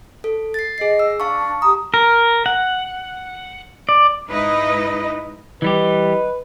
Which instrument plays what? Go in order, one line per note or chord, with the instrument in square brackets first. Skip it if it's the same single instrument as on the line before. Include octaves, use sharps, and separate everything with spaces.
[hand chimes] A4
A6 C7
[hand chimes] G#4 C7 [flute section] D#5
[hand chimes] E6
[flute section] D4 [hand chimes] F5 A5 C#6
[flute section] G4 D#6 [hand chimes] A#5
[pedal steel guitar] A#4
F#5
D5
[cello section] G#2 D#4 E4 B4 D#5
[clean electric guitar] E3 G3 G4 [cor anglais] B4 [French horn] D#5